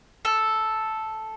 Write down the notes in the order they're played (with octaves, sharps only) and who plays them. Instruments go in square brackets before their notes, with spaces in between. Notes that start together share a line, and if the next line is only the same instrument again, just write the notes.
[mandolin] A4